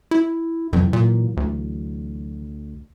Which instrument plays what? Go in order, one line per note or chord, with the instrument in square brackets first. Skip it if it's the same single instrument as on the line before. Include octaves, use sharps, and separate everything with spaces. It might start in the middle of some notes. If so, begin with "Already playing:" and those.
[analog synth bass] E4
[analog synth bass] F2 [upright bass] E3 F#3
[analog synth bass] A#2
D2